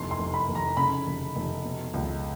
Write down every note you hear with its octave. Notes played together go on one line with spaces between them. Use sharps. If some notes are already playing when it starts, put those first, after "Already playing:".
Already playing: F1 E2 C6
C6
F1
B5
F1
A#5
C#3 B5
F1
F1
B2
C#2